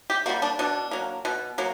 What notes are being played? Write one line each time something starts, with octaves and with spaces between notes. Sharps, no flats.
G4
G3 A#3 F#4
D4
B2 D4
F#3 A#3
B2
F#3 A#3